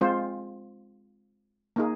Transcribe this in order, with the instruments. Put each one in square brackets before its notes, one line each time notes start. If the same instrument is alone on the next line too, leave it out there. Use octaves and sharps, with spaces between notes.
[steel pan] G#3 C4 F4 C5
A#3 D#4 G#4